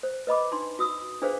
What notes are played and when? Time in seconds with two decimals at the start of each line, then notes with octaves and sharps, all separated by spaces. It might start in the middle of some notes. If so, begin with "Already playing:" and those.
0.03 C5
0.27 B4 D#5 B5 D6
0.52 D4 D#4 C6
0.79 F#4 D#6 E6
1.22 D4 G#4 B4 C5 F5